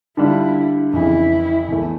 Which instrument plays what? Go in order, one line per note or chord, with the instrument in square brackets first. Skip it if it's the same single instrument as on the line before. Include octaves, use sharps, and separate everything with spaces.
[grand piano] D3 G3 D4 F4 [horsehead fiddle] E4
[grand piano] F2 C#3 E3 [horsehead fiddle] E4
[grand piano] E2 E3 A3